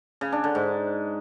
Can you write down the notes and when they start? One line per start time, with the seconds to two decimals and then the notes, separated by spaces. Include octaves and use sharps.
0.21 C#3
0.32 D4
0.44 D3
0.55 G#2